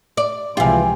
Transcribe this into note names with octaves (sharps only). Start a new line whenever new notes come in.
D5
C#2 C3 E3 F3 F4 G4 G#5